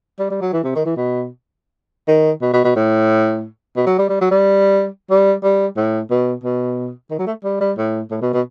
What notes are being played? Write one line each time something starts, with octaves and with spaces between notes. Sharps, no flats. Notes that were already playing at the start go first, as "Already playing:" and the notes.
G3
G3
F#3
E3
C3
D#3
E3
B2
D#3
B2
B2
B2
A2
B2
F#3
G3
G3
F#3
G3
G3
G3
A2
B2
B2
D#3
F#3
A3
G3
G3
A2
A2
B2
B2